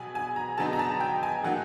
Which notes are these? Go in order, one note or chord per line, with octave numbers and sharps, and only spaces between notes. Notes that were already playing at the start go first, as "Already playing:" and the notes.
Already playing: B2 F#3 B3 G#5
G#5
A#5
D3 F#3 B3 D#4 A5
A#5
A5
G5
G#5
A2 F#3 A#3 D#4 F#5